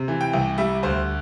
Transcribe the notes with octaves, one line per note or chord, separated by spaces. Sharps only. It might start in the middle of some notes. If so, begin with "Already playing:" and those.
Already playing: C3
E3
G5
C2
G3 E5
D2 C5